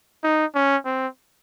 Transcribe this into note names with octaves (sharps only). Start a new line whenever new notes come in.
D#4
C#4
C4